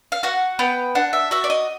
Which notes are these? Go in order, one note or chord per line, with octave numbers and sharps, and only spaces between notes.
F5
F#4 F#5
B3 G5
D4 F#5
E5
F#4 E5
D5
D#5